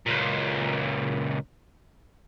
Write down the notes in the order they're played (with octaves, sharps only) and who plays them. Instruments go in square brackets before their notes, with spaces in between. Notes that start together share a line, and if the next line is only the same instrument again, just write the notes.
[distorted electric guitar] C#2 A#2